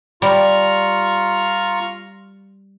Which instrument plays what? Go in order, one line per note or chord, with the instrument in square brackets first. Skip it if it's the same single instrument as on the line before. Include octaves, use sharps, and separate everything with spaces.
[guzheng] G3 [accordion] F4 A#5 C#6